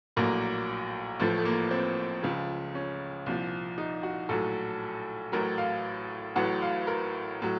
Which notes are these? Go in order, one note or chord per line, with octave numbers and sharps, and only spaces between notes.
A#1 A2 F#3 A#3
A1 A2 F3 A3
A3
A#3
C4
C#2 C#3 F3
C#4
C2 A#2 F3
D#4
F#4
A#1 A2 F#3 A4
A1 A2 F#3 A#4
F5
A1 A2 F#3 F#5
F5
A#4
A2 F#3